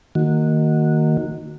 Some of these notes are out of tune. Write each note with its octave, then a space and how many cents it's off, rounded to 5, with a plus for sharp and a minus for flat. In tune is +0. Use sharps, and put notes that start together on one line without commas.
D#3 +0 A#3 -20 F#4 -10